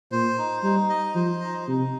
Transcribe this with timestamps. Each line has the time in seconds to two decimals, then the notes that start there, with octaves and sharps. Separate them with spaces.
0.12 A#2 C5
0.38 D#4
0.63 G3 D#4
0.90 D#5
1.15 F3 C5
1.42 D#4
1.68 C3 D#4